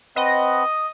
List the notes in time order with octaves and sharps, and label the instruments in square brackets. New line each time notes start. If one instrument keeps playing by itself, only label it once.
[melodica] C4 B4 F#5 [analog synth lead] D#5